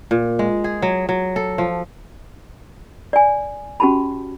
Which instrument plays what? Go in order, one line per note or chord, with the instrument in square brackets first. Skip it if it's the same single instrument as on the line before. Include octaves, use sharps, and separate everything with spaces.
[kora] A#2
G#3
G#4
F#3
F#3
A4
F3
[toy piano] D5 G#5
C#4 F#4 G4 A5 B5